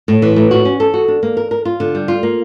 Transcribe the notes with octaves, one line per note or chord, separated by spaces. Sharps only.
A2
E3
A2
F#4
C#4
A4
F#4
D4
A#3
A#4
A#4
F4
D3
G3
F4
A#3